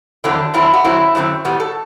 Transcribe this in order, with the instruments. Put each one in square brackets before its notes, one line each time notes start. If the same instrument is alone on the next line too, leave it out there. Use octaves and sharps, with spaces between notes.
[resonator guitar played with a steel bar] E2 D3 F#3 C4 D4
E2 D3 F#3 C4 E4
F#4
F#2 D3 F#3 C4 E4
F#2 D3 F#3 C4
A2 G3 B3 F#4
A4